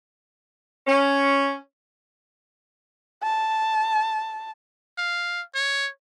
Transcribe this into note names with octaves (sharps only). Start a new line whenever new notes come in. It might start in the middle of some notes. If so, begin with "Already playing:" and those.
C#4
A5
F5
C#5